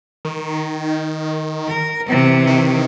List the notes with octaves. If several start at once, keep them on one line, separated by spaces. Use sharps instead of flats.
D#3
A#4
C3 E3
D#3